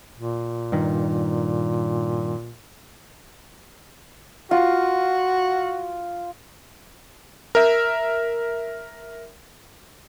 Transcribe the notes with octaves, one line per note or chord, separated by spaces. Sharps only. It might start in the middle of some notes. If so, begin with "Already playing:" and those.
A#2
G2 D#3
F4 F#4
A#4 E5